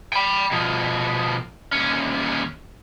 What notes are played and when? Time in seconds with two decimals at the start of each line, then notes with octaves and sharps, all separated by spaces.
0.13 G5 B5
0.51 B2 F3
1.72 D#2 C#4